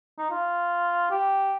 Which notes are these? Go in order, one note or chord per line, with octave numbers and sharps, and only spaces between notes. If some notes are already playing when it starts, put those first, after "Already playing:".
D#4
F4
G4